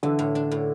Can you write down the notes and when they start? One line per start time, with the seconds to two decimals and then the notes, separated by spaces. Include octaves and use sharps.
0.03 D3 E3
0.19 A2
0.35 D4
0.51 A2